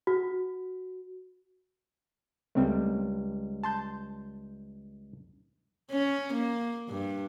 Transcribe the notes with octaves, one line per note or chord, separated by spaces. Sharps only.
F#4
C#2 G3 A3 C4
A5 C6 G6
C#4
A#3
G2